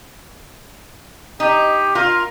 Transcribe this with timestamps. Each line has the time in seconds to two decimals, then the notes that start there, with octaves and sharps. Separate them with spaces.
1.40 D#4 G4
1.95 F4 A#4